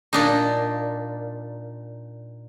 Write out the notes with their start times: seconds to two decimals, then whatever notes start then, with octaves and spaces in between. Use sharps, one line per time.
0.13 A#2 D4 D#4